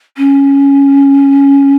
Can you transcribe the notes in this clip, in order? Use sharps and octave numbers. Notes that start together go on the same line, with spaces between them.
C#4